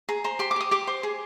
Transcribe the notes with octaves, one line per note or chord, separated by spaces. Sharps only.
G#4 A#5
C5 A#5
G4 C6
D6
G4 D#6
G4 D6
C5
G#4